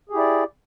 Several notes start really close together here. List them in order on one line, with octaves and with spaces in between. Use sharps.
G#4 G4 E4 D5